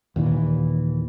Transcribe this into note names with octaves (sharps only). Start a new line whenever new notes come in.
D#2 A#2 D#3 E3